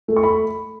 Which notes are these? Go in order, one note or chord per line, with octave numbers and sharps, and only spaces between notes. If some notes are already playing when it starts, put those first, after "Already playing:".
A3
C#6
B5